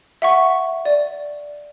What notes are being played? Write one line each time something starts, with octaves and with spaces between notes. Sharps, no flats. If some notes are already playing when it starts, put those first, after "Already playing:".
E5 F#5 C#6
D5